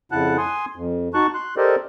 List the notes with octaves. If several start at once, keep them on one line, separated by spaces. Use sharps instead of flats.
F2 C#3 E4 F#5 A5 F#6
G#5 C6 D#6
F2
D#4 F#4 A5 C#6 F#6
C6 F#6
G4 A4 A#4 C5 D5 D#5